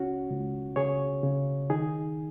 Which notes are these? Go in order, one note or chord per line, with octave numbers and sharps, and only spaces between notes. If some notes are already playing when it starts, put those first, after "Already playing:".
Already playing: C#2 C#4 F#4
C#2
C#3 G#4 C#5
C#3
D#3 D#4 G#4